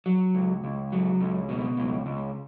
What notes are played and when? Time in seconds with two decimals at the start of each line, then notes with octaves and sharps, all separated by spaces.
0.06 F#3
0.35 C#2
0.64 C#2
0.92 F#3
1.20 C#2
1.49 B2
1.77 C#2
2.06 C#2